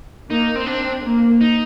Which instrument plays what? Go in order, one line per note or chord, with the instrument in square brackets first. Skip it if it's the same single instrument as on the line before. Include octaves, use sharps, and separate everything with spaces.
[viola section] A#3 [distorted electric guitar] D#4
[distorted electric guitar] C4
[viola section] C4 [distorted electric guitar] D4
[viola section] A#3
[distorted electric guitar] D#4